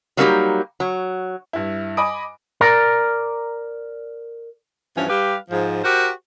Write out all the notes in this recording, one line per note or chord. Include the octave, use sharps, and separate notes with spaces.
F#3 G3 A#3 D#4 F#4 G4
F#3
G2 E4
D#5 G#5 B5 D6 D#6 D7
A#4 D5 A#5
G2 E3 F3 C#4
G3 G4 B4 F5
G#2 F3
F#4 G4 A#4 C5